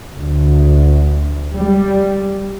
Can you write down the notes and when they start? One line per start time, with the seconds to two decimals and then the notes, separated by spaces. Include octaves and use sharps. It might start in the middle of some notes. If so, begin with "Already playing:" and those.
0.15 D2
1.54 G3